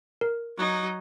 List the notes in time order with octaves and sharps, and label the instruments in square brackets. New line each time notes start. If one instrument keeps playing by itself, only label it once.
[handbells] A#4
[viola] F#3 D#4